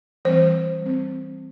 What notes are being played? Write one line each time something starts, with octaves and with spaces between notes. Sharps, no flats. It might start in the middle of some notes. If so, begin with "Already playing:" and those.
E3 G3 C4 C5
G3 C4